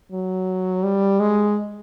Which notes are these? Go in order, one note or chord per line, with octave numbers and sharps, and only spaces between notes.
F#3
G3
G#3